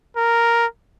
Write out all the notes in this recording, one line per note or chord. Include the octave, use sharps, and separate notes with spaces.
A#4